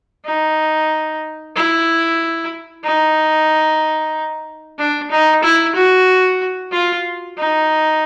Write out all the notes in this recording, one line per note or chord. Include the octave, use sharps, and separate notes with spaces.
D#4
E4
D#4
D4
D#4
E4
F#4
F4
D#4